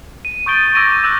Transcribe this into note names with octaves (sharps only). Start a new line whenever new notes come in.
D#7
C#6 D#6 G6 A6 D7 G7
D6 E6 G#6 A#6 D7 D#7
D6 E6 F#6 G6 D#7